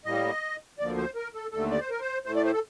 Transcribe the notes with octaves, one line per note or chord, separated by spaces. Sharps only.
A2 G3 A#3 D#5
D2 D3 F3 A#3 D5
C5
A#4
A4
D#2 D3 A3 A4
D5
C5
A#4
C5
A2 A3 C5
D5
C5
A4